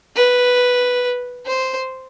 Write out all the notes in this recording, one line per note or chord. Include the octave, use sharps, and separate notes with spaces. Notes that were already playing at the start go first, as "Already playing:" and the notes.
B4
C5